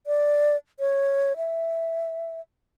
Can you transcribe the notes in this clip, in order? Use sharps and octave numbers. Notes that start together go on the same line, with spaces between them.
D5
C#5
E5